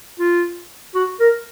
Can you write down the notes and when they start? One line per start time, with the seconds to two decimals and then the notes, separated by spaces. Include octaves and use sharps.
0.19 F4
0.95 F#4
1.20 A#4